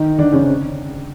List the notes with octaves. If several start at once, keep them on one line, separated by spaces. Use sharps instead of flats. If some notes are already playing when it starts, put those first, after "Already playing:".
Already playing: D#3 D#4
D3 D4
C#3 C#4
C4